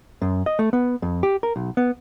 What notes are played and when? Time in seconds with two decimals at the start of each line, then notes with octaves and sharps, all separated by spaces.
0.22 F#2
0.46 D#5
0.59 A3
0.73 B3
1.02 F2
1.23 G4
1.43 A#4
1.56 B1
1.77 B3